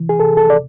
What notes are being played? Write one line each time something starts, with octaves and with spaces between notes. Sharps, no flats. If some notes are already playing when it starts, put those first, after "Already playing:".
Already playing: C3 E3
G#4
C3 A4
A4
D5